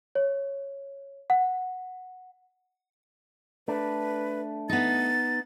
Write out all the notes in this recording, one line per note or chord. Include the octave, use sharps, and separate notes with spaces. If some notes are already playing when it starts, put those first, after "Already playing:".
C#5
F#5
A3 D4 B4
B3 D#4 A6